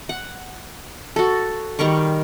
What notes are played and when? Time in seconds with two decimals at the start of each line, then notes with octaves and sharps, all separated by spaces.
0.09 F#5
1.16 F#4 A4
1.79 D#3 G3 A#4 C#6